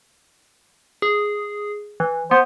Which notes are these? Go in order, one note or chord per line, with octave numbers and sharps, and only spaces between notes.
G#4
E3
B3 C5